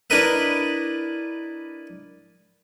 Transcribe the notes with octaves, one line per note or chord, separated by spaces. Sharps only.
D4 E4 A#4 B4 D#5 E5